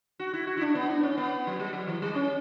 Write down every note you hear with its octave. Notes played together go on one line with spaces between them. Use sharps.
F#4
E4
F#4
E4
D4
B3
D4
C#4
B3
F#3
G3
F#3
E3
G3
C#4